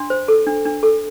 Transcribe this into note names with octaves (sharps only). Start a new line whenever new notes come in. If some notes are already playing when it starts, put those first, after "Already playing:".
Already playing: D4 C6
C5
A4
D4
D4
A4